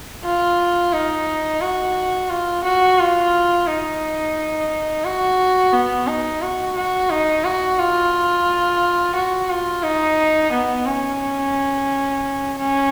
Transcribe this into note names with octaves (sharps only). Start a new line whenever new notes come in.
F4
D#4
F#4
F4
F#4
F4
D#4
F#4
B3
D#4
F#4
F#4
D#4
F#4
F4
F#4
F4
D#4
B3
C#4
C#4